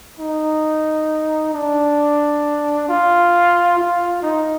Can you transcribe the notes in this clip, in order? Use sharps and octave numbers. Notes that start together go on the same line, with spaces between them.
D#4
D4
F4
F4
D#4